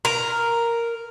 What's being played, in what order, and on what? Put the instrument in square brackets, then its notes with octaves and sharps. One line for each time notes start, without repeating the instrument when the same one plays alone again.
[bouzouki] A#4